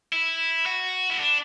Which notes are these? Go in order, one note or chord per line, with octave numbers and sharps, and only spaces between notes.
E4
F#4
E4
D4